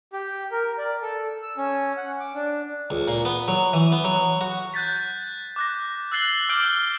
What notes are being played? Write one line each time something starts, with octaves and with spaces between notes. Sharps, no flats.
G4
A#4
D5
A4
E6
C#4
F#5
D6
D4
C#2
A#2
B3
F#3
E3
B3
F#3
F#4
F#6 G6 A6 B6
D6 F#6 A#6
E6 F#6 A6 C7 F#7 G7
D6 F6 G6 D7 G7